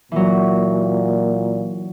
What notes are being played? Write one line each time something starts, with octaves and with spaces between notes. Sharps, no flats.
A#2 E3 F#3